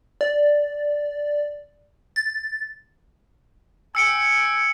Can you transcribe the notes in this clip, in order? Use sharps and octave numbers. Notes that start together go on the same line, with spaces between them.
D5
A6
G5 G#5 E6 C#7 D7